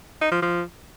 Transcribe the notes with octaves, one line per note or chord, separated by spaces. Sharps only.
D#4
F3
F3